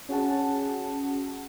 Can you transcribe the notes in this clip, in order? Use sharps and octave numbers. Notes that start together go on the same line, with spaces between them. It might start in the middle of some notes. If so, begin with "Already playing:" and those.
C#4 F#4 G#4 F#5 A5